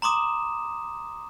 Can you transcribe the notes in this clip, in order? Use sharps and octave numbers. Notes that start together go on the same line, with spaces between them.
A#5 C6 D6 D#6 E7